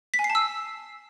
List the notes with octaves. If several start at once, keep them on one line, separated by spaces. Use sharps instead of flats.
B6
G#5
C7
A5
E6